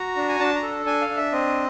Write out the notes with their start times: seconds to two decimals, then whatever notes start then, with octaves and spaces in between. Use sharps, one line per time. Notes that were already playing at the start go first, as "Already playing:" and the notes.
Already playing: F#4 A#5
0.16 D4
0.29 G#5
0.39 D4 A5
0.56 A#5
0.63 A4
0.86 D4 G#5
1.02 F5
1.09 D4
1.17 E5
1.32 C4 D#5